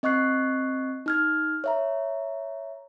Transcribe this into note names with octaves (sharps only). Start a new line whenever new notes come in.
C4 D#5 C#6 F#6 C7
D#4 F6 G#6
C#5 E5 A#5